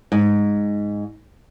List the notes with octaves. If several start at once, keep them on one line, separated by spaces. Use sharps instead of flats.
G#2